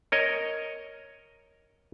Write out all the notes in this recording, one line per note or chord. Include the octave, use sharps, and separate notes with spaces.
A#4 C#5 D#5